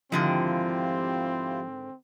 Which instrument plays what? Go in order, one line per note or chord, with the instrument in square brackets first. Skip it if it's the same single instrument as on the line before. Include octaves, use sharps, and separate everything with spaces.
[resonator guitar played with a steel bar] G#2 D3 D#3 [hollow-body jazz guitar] F3 [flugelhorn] C4 [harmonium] E4 F4 G4